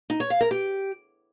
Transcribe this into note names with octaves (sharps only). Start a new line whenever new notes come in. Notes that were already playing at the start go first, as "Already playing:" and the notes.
D#4
C#5
F5
A#4
G4